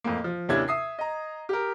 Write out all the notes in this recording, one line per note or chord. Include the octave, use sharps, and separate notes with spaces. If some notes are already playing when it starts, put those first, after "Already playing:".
F2 A2 A#3
F3
D#2 C3 C#4 D4 E4 G#6
E5 D#6 C7
D#5 A#5
G4 A#4